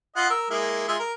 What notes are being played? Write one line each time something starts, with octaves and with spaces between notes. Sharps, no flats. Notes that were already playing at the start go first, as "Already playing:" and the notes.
F4 D#5 F#5
A#4 E6
G#3 A#3 E4
G#3 F4 E5
A#4